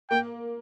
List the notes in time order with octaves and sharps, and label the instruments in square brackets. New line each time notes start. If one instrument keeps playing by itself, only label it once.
[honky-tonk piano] A#3 [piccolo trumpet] G5